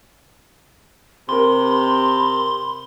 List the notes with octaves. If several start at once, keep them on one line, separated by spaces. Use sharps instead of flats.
C3 G4 A#4 B5 C6